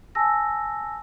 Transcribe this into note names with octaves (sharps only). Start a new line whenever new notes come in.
G#5 A5 E6 A#6